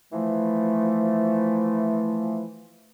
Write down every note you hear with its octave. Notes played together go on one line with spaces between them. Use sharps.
E3 F3 A3